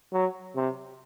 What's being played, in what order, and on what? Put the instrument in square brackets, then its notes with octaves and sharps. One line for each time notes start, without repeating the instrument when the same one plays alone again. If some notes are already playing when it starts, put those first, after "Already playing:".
[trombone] F#3
C3